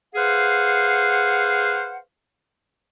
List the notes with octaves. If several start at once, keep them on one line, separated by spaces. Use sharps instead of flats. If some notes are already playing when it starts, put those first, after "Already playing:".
G#4 B4 C5 F5 F#5